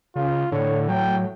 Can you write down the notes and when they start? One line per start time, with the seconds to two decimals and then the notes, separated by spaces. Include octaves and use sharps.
0.16 C#3 F4
0.52 A2 D3 C#5
0.89 F#3 G5